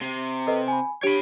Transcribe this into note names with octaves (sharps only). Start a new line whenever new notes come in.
C3
A4 B4 D#5
G#5 B5
D4 G4 C#5 B5 D7